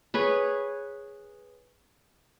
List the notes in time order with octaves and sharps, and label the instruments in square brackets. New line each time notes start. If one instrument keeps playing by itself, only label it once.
[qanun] G#4 B4 C#5